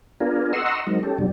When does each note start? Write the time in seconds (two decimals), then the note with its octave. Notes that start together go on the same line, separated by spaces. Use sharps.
0.20 B3 D4 F4 G#4 A#4
0.53 D#5 F#5 A#5 C6 C#6 E6
0.87 F#3 G#3 C4 D#4 A#4
1.03 C#4 G4 A4
1.18 F2 B2 F#3 G3 D4